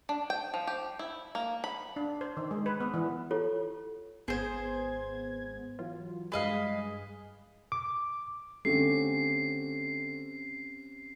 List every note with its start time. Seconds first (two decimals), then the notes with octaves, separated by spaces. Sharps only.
0.09 D4
0.30 G5
0.54 F3
0.67 G4
0.99 E4
1.35 A#3
1.64 B5
1.96 D4
2.21 C5
2.37 D#3
2.51 G#3
2.66 B4
2.80 B3
2.94 E3
3.31 E4 F4 G4 A4 C#5
4.28 G#1 B3 G#4 C5 G#6
5.79 E3 F#3 F4
6.32 G2 G#3 G#4 B4 D#5 F5
7.72 D6
8.65 D3 A3 C4 C#4 G4 C7